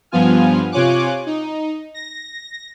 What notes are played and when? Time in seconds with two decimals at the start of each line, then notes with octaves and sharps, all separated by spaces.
0.11 G2 F3 B3 F4 G#5 F6
0.72 C3 F4 C#5 G#5 D6 F#6
1.26 D#4
1.94 A#6